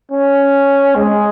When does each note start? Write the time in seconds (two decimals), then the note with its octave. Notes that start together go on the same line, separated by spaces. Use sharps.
0.12 C#4
0.95 G#3